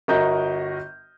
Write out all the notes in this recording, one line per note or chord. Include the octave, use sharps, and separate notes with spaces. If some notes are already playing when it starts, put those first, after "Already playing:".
G1 F#4 A#4 D#5 A#5 G6